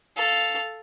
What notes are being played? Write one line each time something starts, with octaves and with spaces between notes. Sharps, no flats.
A4 F5